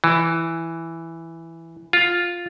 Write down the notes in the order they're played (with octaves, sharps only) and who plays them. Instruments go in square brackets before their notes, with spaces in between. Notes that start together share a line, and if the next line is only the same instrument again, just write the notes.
[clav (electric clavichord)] E3
F4